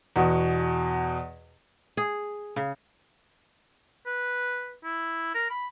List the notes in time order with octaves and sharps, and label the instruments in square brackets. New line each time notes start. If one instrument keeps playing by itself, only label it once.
[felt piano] E2 B2 F#4
[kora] G#4
C#3
[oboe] B4
E4
A#4
B5